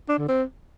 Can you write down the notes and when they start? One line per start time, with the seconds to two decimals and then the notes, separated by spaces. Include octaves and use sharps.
0.09 D4
0.18 D3
0.28 C4